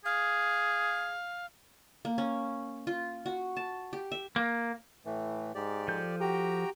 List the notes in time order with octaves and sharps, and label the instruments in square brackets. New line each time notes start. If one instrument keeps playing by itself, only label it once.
[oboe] G#4 [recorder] F5
[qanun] A#3
C#4
F4
F#4
A5
G4
E5
[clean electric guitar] A#3
[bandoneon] A2 E3 A3
[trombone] G#2 [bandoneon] G4 D5
[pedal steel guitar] F3 A4 G6
[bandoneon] F#4 G5 A#5 [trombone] G4